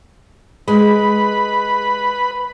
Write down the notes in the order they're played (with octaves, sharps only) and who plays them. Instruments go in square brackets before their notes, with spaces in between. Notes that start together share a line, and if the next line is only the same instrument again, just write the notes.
[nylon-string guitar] G#3 [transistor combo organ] B4 B5